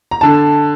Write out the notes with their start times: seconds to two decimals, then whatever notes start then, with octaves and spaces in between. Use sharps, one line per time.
0.11 A#5
0.21 D3 A5